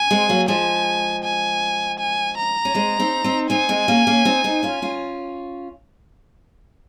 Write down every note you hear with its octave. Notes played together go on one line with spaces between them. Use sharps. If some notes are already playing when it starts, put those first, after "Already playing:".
Already playing: G#5
G#3 C4
F#3 A#3
F3 G#3 G#5
G#5
G#5
A#5
C#4
G#3 C4
C4 D#4
C4 D#4
C4 D#4 G#5
G#3 C4
A#3 C#4
A#3 C#4
C4 D#4
C4 D#4
C#4 F4
C#4 F4